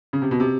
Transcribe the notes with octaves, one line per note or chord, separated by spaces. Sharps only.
C#3
C3
B2
C3